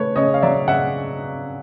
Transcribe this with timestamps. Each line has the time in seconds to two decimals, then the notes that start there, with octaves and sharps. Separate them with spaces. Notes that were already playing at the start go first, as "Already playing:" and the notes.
Already playing: C#3 A3 B4 C#5
0.16 C#3 C#5 D#5
0.34 F5
0.42 F#3 D5 E5
0.68 C#3 E5 F#5